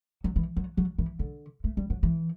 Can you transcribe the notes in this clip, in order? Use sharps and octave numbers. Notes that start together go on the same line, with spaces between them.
F#3
E3
F#3
F#3
E3
D3
A3
G3
F#3
E3